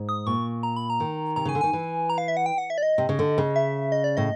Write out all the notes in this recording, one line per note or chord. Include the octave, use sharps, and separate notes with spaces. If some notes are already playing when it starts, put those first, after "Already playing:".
Already playing: G#2
D#6
A#2 C#6
A#5
B5
A#5
D#3
C3 A#5
C#3 G#5
D3
D#3 G#5
E3
A#5
F5
E5
F#5
G5
F#5
E5
D5
D#5
C3
C#3
D3
C#3
E5
D#5
D5
A2 D#5